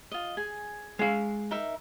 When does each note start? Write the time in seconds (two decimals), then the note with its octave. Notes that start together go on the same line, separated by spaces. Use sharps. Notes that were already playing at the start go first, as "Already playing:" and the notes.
0.11 F4 D#5
0.37 G#4 G#5
0.99 G#3 F5
1.51 D#4 A#4 E5